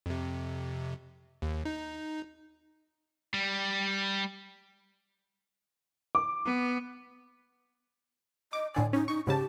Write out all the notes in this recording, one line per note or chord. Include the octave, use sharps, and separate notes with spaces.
F2 C3
D#2
D#4
G3
D6
B3
D#5 D6
A2 D3 D5 G#5
C#4 D#4
D#4 C#6
G#2 C#3 G4 A5